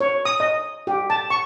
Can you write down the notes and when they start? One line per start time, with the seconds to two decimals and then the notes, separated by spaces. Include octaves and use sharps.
0.01 C#5
0.25 D#6
0.40 D#5
0.87 G4
1.10 A5
1.30 C#6